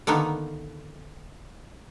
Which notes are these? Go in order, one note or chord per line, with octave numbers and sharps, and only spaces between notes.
D3 D#3 A#3 B3